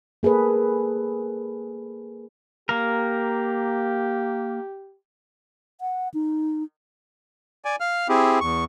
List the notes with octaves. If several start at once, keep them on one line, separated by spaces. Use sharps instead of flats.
A#3 G#4 A4 B4
A#3 G4 A#4
F#5
D#4
D5 G#5
F5 F6
C4 E4 G4 G#4
E2 C#6